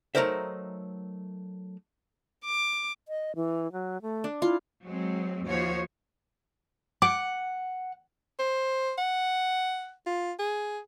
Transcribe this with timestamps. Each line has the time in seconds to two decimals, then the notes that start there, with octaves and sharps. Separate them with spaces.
0.15 F#3 A3 D#4 A#4 C5 E5
2.45 D6
3.08 D#5
3.36 E3
3.72 F#3
4.02 A3
4.24 D4
4.42 E4 F4
4.84 F#3 G#3 C4
5.46 D#2 F3 F#4 C5 C#5
7.02 F#5 D6
8.39 C5
8.98 F#5
10.06 F4
10.39 G#4